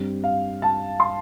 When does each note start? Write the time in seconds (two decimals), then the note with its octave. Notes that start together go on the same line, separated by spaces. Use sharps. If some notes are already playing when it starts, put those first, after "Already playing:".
Already playing: G2 G3 C4
0.24 F5
0.62 A5
1.00 C6